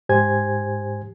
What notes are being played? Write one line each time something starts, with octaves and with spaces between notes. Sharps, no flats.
G#2 G4 C5 G#5 G#6